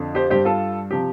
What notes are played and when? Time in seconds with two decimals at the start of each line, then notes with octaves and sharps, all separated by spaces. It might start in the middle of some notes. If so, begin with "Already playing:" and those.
Already playing: F2 D3 F3
0.15 G4 C5
0.30 G2 G3 G4 C5
0.45 F4 A4
0.91 C3 F3 G4